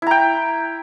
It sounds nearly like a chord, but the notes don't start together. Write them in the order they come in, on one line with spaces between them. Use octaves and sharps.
E4 A#5 G5